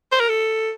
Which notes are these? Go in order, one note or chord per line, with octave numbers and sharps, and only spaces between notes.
C5
A#4
A4